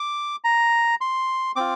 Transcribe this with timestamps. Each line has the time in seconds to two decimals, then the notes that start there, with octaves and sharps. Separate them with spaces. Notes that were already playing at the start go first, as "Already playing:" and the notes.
Already playing: D6
0.44 A#5
1.01 C6
1.56 C4 F4 D6